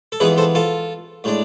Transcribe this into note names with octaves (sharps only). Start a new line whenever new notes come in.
A4
F2 E3 G#3 B3 G#4 B4
A4 C5
F4 A4
A2 G#3 D4